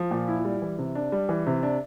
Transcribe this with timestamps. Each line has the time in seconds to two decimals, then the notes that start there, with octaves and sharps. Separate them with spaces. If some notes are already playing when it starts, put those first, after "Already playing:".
Already playing: F3
0.11 A#2
0.28 E4
0.45 G3
0.62 E3
0.78 C3
0.95 D4
1.12 G3
1.29 E3
1.46 C3
1.63 D4